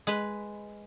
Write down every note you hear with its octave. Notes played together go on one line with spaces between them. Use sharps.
G#3 B4